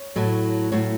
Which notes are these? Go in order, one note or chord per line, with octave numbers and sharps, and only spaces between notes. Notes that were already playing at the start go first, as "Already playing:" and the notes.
Already playing: C#5
A2 F#3 A3
A2 F#3 A3 C#5